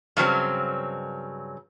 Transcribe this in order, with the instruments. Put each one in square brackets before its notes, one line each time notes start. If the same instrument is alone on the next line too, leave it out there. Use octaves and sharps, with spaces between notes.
[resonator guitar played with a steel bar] G2 C#3 F#3 C4